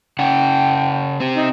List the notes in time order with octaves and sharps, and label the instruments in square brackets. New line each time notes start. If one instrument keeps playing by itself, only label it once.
[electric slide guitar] C#3 F#5 [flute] G5
[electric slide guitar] C4 G4
[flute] D#4